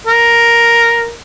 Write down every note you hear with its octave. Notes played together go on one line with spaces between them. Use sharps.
A#4